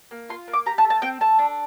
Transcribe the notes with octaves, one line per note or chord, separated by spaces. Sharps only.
A#3
F4 C6
A#3
D6
G4 A#5
A5
A3
A5
C4 G5
A3 A5
D4